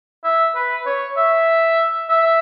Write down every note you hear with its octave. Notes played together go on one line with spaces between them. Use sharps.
E5
B4
C#5
E5
E5